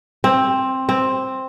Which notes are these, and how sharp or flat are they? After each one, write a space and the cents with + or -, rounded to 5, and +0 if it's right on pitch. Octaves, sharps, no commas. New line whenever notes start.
C4 +10
C4 +5